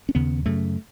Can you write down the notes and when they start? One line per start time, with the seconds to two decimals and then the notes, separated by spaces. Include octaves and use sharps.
0.09 C#4
0.15 D#2 C#3 B3
0.46 F#2 C#3 A3